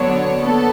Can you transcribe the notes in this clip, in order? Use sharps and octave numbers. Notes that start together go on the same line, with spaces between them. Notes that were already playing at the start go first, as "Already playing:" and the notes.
Already playing: D3 F#3 B3 D4 C#5
B3 A4